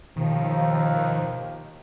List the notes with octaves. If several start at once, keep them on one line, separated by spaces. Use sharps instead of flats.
D#2 B2 D#3 F3